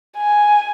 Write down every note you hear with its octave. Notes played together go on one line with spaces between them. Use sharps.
G#5